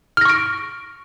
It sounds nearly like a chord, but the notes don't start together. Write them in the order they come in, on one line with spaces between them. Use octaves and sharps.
F6 A#6 C#6 D7